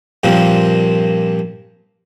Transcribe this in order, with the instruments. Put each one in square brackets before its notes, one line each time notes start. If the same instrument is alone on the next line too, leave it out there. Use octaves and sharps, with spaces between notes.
[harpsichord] G2 A#2 F3 A#3 C4